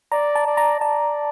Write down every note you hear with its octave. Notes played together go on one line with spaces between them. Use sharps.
D5 A#5
A5
D5
A#5
D5 A5